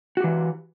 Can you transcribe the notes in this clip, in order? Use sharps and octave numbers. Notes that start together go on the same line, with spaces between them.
E3 F#4 G4